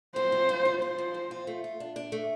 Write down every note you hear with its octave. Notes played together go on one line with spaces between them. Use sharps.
C4 C5
F4
F4
F4
F4 C5
F3
C4
F4
A3
F4
D4
D4
A3